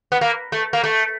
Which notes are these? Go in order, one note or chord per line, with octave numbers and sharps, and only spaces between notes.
B3
A#3
A3
A#3
A3